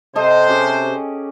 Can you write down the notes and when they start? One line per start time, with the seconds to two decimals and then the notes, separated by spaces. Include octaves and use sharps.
0.16 C3 A4 C5 D#5
0.48 C#4 G4 G#4